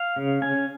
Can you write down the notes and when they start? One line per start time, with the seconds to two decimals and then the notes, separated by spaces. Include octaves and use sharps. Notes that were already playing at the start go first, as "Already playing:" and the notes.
Already playing: F5
0.16 C#3
0.42 C#4 G#5